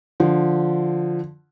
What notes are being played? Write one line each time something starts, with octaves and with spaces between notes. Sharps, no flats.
D3 F3